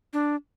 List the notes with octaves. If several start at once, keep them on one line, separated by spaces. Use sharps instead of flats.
D4